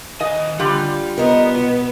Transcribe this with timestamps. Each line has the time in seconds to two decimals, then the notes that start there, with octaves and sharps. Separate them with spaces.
0.21 D#3 D#5 G#5
0.60 D3 G3 F4
1.18 B3 A#4 D#5
1.55 B2